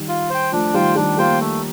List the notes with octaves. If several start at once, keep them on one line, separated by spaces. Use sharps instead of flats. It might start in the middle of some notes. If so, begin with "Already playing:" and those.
Already playing: D#3 G3
F4
C5 G5
F3 A3 D4
D#3 G3 F4 C5 G5
D#3 G3 D4
G3 A#3 F4 C5 G5
A3